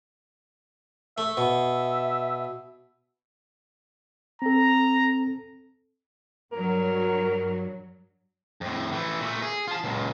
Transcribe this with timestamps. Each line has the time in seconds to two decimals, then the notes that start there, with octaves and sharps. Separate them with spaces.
1.18 A3 E5
1.37 B2
4.42 C4 A4 A#5
6.53 G2 F#3 A#4
8.61 F2 A2
8.92 E3 A3
9.20 A#2 A3
9.42 G#4
9.68 F4 A5
9.84 C#2 A#2